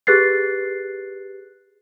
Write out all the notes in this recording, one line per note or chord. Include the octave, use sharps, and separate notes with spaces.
G4 G#4 B4 F#6 A6 C7